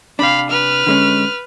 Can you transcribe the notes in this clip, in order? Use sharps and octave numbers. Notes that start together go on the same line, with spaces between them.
C3 D4 F5 B5
B4 F6
D3 G#3 C#4